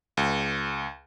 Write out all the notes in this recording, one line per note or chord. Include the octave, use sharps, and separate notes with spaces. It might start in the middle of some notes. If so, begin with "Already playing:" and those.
C#2